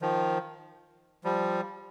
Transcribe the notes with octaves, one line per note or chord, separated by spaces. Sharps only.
D#3 F3
F3 G3